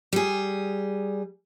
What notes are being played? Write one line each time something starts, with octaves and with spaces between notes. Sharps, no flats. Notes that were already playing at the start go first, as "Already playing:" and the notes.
G3 G#4